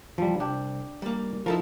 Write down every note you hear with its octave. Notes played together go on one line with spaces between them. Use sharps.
E2 F3 G3
C2 D4 G4
G3 A#3
F3 D#4 E4 A4 A#4